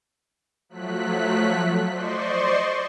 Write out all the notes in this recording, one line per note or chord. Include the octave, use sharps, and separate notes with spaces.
F3 F#3 A3 F#6 B6
C5 D5 D#5 C6 C#6